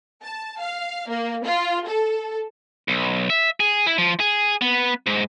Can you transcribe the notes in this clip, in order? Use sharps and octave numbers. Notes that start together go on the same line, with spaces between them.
A5
F5
A#3
F4
A4
B1
E5
G#4
E4
F3
G#4
B3
G#2